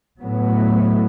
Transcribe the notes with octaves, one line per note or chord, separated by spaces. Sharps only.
A2 F#3 B3